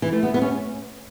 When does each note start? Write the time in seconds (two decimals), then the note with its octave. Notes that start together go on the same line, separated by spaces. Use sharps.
0.02 E3
0.13 A3
0.23 B3
0.34 B3
0.42 C#4